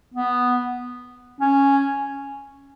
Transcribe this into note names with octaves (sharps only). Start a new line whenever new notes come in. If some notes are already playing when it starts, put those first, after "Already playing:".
B3
C#4